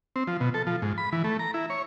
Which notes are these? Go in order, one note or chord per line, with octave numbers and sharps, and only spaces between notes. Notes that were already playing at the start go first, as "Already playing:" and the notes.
C4
F3
B2
A4
F3
G#2
B5
E3
A3
A#5
E4
C#5